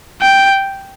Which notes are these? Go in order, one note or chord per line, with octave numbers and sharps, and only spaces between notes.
G5